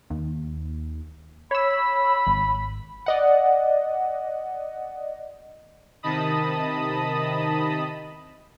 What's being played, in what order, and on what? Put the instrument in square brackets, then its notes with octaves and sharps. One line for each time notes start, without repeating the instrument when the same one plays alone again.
[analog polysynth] D#2
[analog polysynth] C#5 E6 [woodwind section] B5
[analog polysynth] G#1
[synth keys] D5 D#5 F#5
[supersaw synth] C3 D#3 D#5 A5 B5 D#6